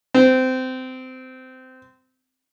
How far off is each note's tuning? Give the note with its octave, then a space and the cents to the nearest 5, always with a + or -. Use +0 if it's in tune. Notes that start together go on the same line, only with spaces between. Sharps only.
C4 -20